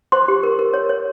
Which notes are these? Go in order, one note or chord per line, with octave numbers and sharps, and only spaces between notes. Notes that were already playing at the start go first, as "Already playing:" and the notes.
C5 C6
G4
A#4
A#4
C#5
C#5